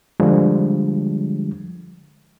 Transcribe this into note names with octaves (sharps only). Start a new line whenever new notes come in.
D3 F3 G3 G#3